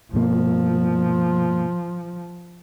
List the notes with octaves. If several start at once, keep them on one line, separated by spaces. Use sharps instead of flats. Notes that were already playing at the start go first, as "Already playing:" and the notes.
G2 B2 F3 A#3